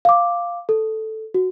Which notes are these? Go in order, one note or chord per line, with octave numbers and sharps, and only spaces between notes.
F5 D6
A4
F#4